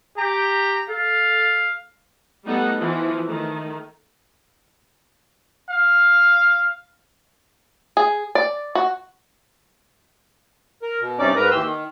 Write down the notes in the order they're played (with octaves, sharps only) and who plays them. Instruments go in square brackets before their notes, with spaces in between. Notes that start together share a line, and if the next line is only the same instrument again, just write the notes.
[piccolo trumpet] G4 [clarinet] A#5
[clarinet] A4 [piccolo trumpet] F5
[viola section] G3 A3 B3 D#4 A4 F#5
E3 F3
D#3 A3
[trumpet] F5
[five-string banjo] G#4
D5
F#4
[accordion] A#4
B2
G2 C3 C#4 D#4 D5 D6
G#2 A#4 B4 A#5
D#2 E3 G4 C6 E6
D#3